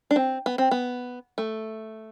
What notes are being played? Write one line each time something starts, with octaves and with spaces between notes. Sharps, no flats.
D4
C4
B3
C4
B3
A3